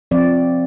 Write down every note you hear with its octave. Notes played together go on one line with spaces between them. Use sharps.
F3 C4 D5